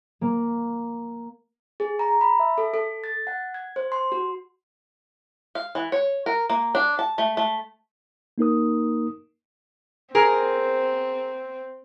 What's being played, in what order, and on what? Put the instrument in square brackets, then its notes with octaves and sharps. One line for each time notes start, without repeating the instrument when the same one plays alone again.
[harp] A#3
[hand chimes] G#4
A#5
B5
E5
A4
A4
A6
F#5
G#6
C5
C6
F#4
[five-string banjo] F5
E3
C#5
A#4
A#3
D4
A5
A3
A3
[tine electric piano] A#3 D#4 A#4 D#6
[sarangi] C4 [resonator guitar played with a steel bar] G#4 A#4